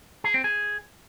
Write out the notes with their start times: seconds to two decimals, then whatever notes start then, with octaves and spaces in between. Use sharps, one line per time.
0.24 G#4
0.34 C4
0.44 G#4